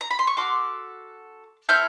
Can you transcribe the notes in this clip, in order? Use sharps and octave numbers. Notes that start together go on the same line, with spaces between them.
A#5
B5
C6
C#6
C#4 F#4 A4 C6 D6
C4 E4 A4 F6 G6